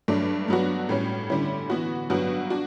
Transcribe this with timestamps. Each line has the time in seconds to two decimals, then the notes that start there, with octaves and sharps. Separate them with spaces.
0.08 G2 F#3 A3 D4
0.48 G2 F#3 B3 D4 F#4
0.89 A2 G3 C#4
1.30 D3 G3 C#4 E4
1.70 E3 B3 F#4
2.10 G2 F#3 B3 F#4
2.50 D4 F#4